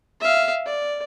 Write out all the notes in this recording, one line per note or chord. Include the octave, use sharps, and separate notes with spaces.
E5 F5
D5